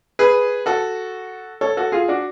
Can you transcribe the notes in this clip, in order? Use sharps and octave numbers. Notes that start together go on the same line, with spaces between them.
G#4 B4
F#4 A4
A4 C#5
F#4 A4
F4 G#4
D4 F#4